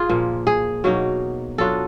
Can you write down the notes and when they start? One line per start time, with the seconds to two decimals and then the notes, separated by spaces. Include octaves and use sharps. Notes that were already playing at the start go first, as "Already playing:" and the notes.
Already playing: F4 G#4
0.09 A#2 F3 A#3
0.47 G#4
0.84 B2 F#3 A#3 D#4
1.58 F#3 B3 D4 F4 A4